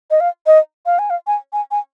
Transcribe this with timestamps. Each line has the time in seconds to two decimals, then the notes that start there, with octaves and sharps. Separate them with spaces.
0.11 D#5
0.20 F5
0.47 D#5
0.86 F5
0.99 G#5
1.10 F5
1.27 G#5
1.53 G#5
1.71 G#5